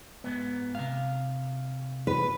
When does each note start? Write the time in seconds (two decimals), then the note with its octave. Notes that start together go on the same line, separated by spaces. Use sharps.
0.24 G#2 B3
0.75 C3 F5
2.07 B4